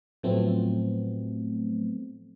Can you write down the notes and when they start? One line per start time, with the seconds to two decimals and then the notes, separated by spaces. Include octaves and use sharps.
0.23 A2 F3 F#3 A3 B3 C4